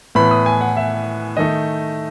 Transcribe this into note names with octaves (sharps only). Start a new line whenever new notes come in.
A2 E3 B3 B5
D#6
G#5
F#5
E5
D#3 A3 D#4 D#5